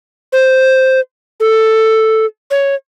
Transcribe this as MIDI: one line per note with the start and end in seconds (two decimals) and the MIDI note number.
0.33 1.00 72
1.40 2.26 69
2.51 2.75 73